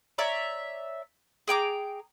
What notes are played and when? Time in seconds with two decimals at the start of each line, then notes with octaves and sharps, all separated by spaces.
0.18 C#5 D5 E5 A#5
1.48 G#4 G5 A#5 D6